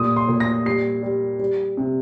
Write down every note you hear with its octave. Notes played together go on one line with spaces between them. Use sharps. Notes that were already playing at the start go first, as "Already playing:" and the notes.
Already playing: A#2 G3 D#6
C6
A#2
A#6
G3 C7
G3
G3
C3